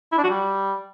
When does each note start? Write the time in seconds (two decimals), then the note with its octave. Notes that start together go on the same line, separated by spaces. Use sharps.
0.12 E4
0.18 D4
0.24 F#4
0.30 G3